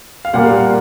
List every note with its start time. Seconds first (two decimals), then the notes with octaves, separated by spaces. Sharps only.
0.25 F5
0.34 A#2 G3 A#3 F#5